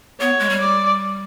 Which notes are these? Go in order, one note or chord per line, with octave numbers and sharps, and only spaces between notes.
B3 C#5
G#3
G3
D5